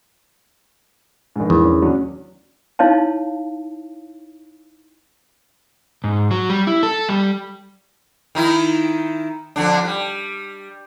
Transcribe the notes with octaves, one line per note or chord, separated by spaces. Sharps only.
A#1 G#2
E2
C#4
F#3 C#4 D4
D#4 E4 C#5 F5 A5
G#2
F#3
G3
E4
A4
G3
D#3 D#4 E4
F2 D3 D4
G3